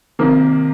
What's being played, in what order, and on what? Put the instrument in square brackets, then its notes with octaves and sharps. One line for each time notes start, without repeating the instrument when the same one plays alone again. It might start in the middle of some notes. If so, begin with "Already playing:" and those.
[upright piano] C3 D#3 A#3